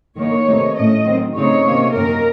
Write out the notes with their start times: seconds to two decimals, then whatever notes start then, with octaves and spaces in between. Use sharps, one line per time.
0.17 D#3 A#3 D#4 C#5
0.47 C3 D#3 A3 D#4
0.75 A2 A3 C#4 D#5
1.05 D#3 F#3 C4
1.35 C#3 A3 C4 D#4 C#5
1.64 C3 D#3 A#3 C#4
1.93 F#2 D#3 A#3 C#4 A#4